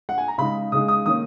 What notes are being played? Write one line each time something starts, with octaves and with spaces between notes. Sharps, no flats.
F#5
G#5
A#5
C#3 G#3 D#4 B5
C#3 G#3 D#4 D#6
D#6
D#3 A#3 C#4 D#6